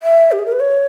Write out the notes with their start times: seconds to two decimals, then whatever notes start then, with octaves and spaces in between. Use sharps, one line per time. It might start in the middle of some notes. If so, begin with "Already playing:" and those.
0.03 E5
0.32 G4
0.39 G#4
0.46 A#4
0.52 B4
0.60 C#5